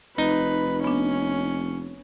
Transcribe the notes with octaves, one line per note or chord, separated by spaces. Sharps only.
F1 D#4 B4
B3 C#4 D4